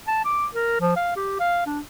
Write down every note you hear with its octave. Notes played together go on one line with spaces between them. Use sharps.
A5
D6
A#4
F3
F5
G4
F5
D4